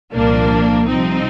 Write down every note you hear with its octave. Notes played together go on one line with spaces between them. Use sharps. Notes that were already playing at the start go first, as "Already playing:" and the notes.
C2 A#2 F3 A#3 D4
C2 C3 F3 C4 D#4